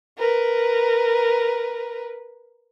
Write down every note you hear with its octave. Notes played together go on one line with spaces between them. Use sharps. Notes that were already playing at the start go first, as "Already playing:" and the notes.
A#4 B4